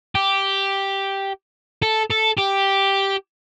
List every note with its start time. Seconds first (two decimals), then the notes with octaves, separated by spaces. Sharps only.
0.15 G4
1.83 A4
2.11 A4
2.38 G4